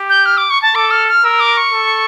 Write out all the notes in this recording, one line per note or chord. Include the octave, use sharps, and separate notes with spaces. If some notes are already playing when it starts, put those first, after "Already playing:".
Already playing: G4
G6
F6
D6
C#6
A5
A4 D6
F6
F6
A#4 E6
D6
C#6
A4